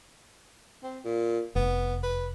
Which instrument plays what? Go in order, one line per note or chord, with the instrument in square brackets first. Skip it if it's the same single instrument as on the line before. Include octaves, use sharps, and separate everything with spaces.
[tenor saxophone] C4
A#2
[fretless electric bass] F1 [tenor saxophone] B3
[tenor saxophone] B4